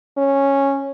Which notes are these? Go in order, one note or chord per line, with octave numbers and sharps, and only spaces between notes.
C#4